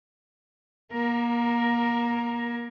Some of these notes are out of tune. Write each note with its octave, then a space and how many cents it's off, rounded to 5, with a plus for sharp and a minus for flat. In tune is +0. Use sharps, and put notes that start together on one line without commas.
A#3 +30 A#4 +10